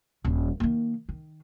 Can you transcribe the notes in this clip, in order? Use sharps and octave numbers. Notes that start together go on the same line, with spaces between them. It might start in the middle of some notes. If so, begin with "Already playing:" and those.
D#1
D#3 A#3
D#3